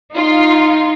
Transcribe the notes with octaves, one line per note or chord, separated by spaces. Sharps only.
D#4 F4